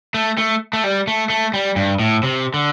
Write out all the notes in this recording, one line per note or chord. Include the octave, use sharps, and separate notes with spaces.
A3
A3
A3
G3
A3
A3
G3
G2
A2
C3
D3